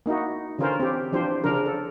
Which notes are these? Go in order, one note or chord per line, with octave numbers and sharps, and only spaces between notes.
A#3 D#4 E4 F#4
D3 E3 C#4 F4 A#4 C5
C4 G4
E3 F3 D4 G4 C5
C#3 F3 D4 A#4
A4